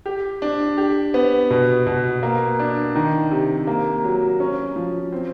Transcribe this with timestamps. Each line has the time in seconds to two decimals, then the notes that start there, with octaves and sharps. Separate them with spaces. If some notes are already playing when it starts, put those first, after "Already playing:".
0.06 G4
0.42 D4
0.78 G4
1.14 B3
1.51 B2
1.87 B2
2.23 A#3
2.59 D4
2.95 D#3
3.31 C3
3.67 A#3
4.04 F#3
4.40 C#4
4.76 F3
5.12 C4